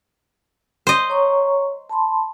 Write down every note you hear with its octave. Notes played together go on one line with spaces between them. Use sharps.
C5 D#5
C#5 A#5 C#6
A5 B5 C6